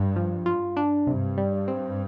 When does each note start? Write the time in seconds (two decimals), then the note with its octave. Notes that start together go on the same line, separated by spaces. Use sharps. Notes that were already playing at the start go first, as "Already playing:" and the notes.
Already playing: G2
0.16 F3
0.46 F4
0.77 D4
1.07 G2 C3
1.37 G3
1.68 C4